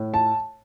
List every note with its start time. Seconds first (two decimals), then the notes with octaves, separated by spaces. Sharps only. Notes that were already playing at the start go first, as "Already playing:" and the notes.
Already playing: A2
0.14 A5